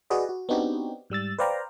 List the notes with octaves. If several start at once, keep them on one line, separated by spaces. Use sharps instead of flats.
F#4 G#4 B4 D5 D#5
F#4
B3 C4 D4 D#4 F#4 G4
G#2 G3 E6 A6
B4 C5 D5 F5 G5 A#5